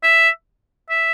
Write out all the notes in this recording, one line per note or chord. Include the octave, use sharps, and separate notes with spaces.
E5
E5